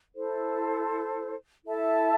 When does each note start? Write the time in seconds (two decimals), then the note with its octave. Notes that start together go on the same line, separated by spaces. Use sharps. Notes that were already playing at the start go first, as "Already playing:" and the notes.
0.14 E4 A4 C5
1.66 E4 A4 E5 A5